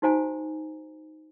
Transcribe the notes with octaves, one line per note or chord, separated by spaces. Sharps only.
D#4 F#4 C5 F5 G#5 A#5